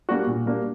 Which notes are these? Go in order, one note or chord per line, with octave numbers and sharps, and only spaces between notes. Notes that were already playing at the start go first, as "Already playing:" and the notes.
G3 A#3 D4 F#4
A#2
G3 A#3 D4 F#4